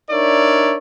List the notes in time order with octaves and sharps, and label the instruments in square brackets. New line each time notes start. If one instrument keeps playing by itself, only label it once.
[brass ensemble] D4 D#4 A#4 C#5 D5 E5